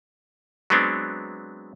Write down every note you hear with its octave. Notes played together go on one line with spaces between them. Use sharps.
F#3 G#3 B3 C4 D4